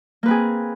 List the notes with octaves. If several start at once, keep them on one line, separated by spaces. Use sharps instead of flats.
A#3 C4 G#4 B4